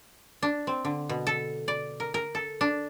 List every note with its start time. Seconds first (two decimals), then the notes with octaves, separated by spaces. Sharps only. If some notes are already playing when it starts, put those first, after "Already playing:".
0.42 D4
0.67 C4
0.85 D3
1.09 B2
1.27 A4
1.68 D5
2.00 A#4
2.14 A#4
2.35 A4
2.61 D4